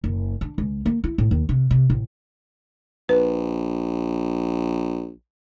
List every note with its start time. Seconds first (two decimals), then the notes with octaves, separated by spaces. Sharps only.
0.04 F#1
0.41 D4
0.58 C#2
0.86 A#3
1.04 E4
1.18 A2
1.31 D#2
1.49 C3
1.71 C3
1.90 A1
3.09 A#1 B4